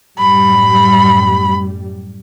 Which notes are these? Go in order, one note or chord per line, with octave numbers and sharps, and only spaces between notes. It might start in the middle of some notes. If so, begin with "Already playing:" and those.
F#2 A2 G3 B5